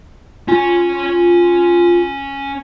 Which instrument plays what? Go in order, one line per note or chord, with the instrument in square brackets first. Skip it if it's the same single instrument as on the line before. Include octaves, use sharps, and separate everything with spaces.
[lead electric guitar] C#4 G#5 [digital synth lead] F4